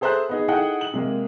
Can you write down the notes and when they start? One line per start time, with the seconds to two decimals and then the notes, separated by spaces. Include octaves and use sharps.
0.01 G#4 A4 C5 E5 A#5 F#6
0.29 B3 D#4 G#4
0.48 D#4 E4 G#4 A4 F#5 G5
0.81 F#7
0.94 C3 G#3 A#3